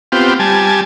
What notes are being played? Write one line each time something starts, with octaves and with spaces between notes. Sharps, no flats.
B3 C4 F4 G4
G3 G#5 A5